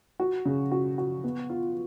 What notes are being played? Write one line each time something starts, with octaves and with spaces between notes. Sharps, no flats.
F#4
C#3
F#4
F#4
B3
F4